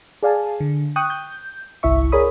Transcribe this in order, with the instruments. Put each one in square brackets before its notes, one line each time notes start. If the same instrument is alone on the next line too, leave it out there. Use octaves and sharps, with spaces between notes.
[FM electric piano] G#4 D5 F5 G#5 A5
D3
G5 C#6 D#6 F#6
G6
G1 C2 E4 E5 C#6
G#4 A#4 C#5 D5 B5 D#6